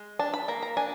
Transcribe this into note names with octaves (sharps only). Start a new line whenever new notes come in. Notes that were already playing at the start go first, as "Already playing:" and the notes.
Already playing: G#3
D4 A5
B5
A#3 A#5
A#5
D4 G#5